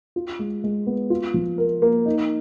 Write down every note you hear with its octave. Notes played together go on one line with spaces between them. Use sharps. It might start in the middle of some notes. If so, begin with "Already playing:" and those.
F4
G#3
G#3
B3
F4
F3
A#4
A#3
D#4